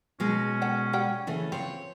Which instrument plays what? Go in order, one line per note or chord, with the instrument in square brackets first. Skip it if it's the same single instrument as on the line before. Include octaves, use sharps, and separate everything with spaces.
[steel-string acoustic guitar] B2 G#3 [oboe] C#4
[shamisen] A4 F#5 G5
G3 F#5 G5
[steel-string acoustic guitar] C#3 E3 A3
[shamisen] F3 C4 [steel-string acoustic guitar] C#5